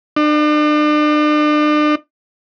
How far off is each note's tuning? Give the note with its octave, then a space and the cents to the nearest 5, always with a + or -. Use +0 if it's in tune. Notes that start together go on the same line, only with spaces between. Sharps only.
D4 +40